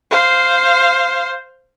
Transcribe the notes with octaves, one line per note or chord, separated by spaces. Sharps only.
C5 F5